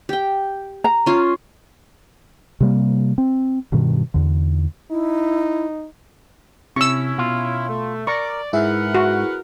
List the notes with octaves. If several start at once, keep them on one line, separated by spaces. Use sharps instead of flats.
G4 G5
A#5
C#4 F4
C3 G3 A#3
C4
G2 B2 D#3
E2 D3
D#4 E4
C3 C#4 E4 C#6 E6
B2 F4
A3
A#4 D5 C#6
G#2 E4 G#4 A#4 B4 E5 F#5
F#4